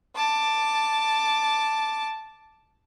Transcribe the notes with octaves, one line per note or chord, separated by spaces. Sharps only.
A5 D6